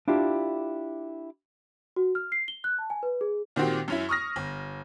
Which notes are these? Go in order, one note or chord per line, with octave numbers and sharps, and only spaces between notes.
D4 E4 F4 G4
F#4
F6
C7
G7
F#6
A5
G#5
B4
G#4
A#2 D#3 C4 F#4 G4
F#2 C#4 E4
C#6 D#6 F6 A#6
G1